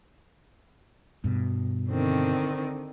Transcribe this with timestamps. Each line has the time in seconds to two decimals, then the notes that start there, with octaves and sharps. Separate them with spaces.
1.24 G2 B2
1.90 D3 D#3 C4